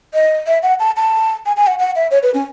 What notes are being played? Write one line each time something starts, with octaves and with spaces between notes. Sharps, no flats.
D#5
E5
F#5
A5
A5
G#5
G#5
F#5
F#5
E5
C#5
B4
C#4